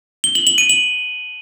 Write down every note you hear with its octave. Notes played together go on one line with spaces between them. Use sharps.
G7
F#7
F#7
D#7
F#7